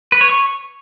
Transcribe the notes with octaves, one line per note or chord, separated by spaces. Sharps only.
B4
C#5
C#6